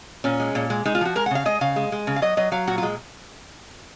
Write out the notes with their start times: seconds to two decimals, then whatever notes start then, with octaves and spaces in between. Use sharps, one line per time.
0.24 A#2 C#4
0.40 G#3
0.55 A#2
0.70 G#3
0.85 G#3 D#4
0.95 F4
1.01 F3 F#4
1.15 G#3 A#4
1.26 F#5
1.31 C#3 F5
1.45 G#3 D#5
1.61 C#3 F5
1.76 G#3
1.92 G#3
2.07 C#3
2.16 F5
2.22 F#3 D#5
2.37 F#3 D#5
2.52 F#3 F5
2.67 A#2 F#4
2.78 F4
2.83 G#3